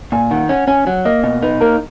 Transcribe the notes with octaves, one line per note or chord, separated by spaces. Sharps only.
A#2 G#5
D#3 F#5
C#4 F#5
C#4 G#5
F#3 F#5
A#3 D#5
B2 D#5
D#4 B4
A#3 A#4